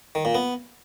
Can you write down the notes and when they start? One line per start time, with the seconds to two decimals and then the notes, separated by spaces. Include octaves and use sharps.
0.15 D#3
0.25 A#2
0.35 B3